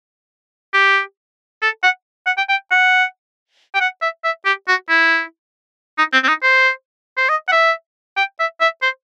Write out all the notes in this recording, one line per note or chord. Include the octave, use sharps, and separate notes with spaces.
G4
A4
F#5
F#5
G5
G5
F#5
G5
F#5
E5
E5
G4
F#4
E4
D#4
C4
C4
D#4
C5
C5
D#5
F#5
E5
G5
E5
E5
C5